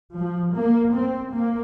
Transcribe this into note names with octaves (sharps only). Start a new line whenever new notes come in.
F3
A#3
C4
A#3